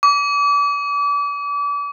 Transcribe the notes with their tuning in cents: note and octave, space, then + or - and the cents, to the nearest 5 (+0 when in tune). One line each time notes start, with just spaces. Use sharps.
D6 -35